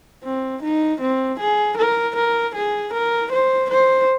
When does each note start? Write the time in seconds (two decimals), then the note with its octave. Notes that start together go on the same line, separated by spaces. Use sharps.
0.24 C4
0.62 D#4
1.00 C4
1.39 G#4
1.77 A#4
2.16 A#4
2.55 G#4
2.93 A#4
3.32 C5
3.70 C5